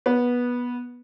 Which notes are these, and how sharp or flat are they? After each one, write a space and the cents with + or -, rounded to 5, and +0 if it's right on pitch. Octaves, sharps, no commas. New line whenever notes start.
B3 -15